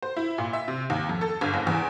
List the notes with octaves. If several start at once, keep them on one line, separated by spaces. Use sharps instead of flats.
C5
E4
A#2
E5
C3
D#2
F2
A4
G1
F#1
E2